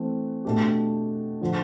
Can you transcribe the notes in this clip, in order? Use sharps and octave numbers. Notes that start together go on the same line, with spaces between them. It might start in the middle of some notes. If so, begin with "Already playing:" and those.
Already playing: E3 A3 C4
B2 A3 D4 G4
D3 F3